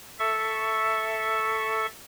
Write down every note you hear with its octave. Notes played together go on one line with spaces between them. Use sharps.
A4 E5 C#6